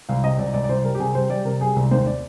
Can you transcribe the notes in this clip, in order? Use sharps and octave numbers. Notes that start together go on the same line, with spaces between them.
C2 F5
C3 D#5
C2 D5
C2 D5
D5
C2 C5
G3 A#4
G4
C3 G#4
G3 C5
G3 D5
C3 A#4
G3 G#4
C2
D#2 C5
D5